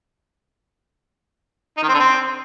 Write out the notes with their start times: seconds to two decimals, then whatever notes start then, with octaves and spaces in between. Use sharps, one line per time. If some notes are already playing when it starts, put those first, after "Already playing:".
1.77 D#4
1.83 D#3
1.88 C4
1.94 D3
2.00 C4